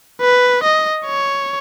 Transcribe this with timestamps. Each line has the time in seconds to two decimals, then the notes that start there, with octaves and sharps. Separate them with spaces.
0.21 B4
0.64 D#5
1.06 C#5